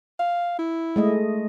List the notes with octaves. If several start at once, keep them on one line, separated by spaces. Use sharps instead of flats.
F5
E4
G#3 A3 D#5